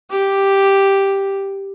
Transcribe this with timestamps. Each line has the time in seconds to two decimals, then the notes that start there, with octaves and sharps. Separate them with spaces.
0.10 G4